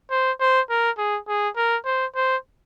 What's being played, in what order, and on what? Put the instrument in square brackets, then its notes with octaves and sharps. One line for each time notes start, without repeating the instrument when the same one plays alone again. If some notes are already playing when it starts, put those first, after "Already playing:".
[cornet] C5
C5
A#4
G#4
G#4
A#4
C5
C5